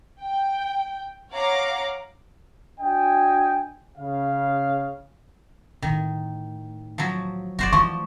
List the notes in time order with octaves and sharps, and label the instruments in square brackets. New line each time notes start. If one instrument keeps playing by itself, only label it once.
[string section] G5
C#5 F5 F#5 A#5 D6
[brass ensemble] D4 F#4 D#5 G5 G#5
C#3 F5
[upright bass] A2 [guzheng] D#3
[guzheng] F3 F#3
[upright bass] F#1 [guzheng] F#4 C5 D5
[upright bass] E3 A3 [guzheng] F3 [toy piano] C#6